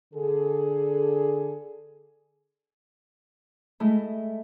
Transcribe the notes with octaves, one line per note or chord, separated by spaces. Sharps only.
D3 G#4 A4
G#3 A3 E4